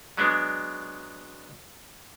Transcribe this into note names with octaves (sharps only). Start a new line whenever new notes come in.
F#3 G#3 B3 D4